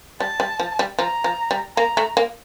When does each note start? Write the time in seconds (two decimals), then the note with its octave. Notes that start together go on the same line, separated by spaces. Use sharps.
0.20 G3 A5
0.40 G3
0.60 F3
0.79 G3
0.99 F3 A#5
1.24 F3
1.51 G3
1.77 A#3 A#5
1.97 A3
2.17 A#3